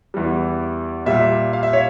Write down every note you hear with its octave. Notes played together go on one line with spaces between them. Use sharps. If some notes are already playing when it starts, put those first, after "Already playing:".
E2 E3 G3
A#2 G3 E5
F5
E5
C#5